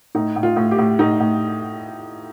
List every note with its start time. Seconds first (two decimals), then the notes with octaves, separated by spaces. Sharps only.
0.15 A2 D#4
0.36 A2
0.43 F4
0.56 A2
0.71 G4
0.79 A2
0.99 A2 D#4
1.20 A2